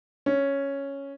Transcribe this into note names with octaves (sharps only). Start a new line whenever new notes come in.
C#4